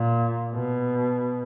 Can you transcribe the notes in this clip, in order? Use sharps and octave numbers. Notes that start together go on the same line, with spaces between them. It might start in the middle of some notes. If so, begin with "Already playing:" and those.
Already playing: A#2
B2